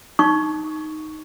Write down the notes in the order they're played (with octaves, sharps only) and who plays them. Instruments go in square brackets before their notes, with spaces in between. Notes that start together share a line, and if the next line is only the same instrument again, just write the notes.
[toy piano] D#4 C#6